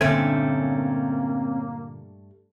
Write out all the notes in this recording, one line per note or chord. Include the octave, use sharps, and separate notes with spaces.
G2 A#2 D3 A3 A#3 C4 C#4 G#5